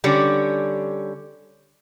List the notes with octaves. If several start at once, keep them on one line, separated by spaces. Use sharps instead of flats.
D3 G3 C#4